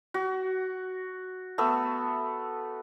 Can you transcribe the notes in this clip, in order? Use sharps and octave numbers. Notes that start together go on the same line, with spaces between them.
F#4
A3 B3 E6